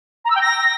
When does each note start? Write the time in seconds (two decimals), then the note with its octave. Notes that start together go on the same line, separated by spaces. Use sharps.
0.24 A#5
0.30 E6
0.35 G5
0.41 A#6